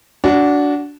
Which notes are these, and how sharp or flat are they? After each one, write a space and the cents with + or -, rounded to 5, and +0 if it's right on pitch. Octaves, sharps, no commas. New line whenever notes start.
D4 -20 F#4 +0